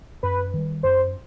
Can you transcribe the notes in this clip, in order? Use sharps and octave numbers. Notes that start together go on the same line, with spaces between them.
F#2 B4
D#3 G3
F#2 C5